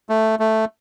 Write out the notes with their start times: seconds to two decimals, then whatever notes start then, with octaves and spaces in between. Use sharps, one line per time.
0.09 A3
0.39 A3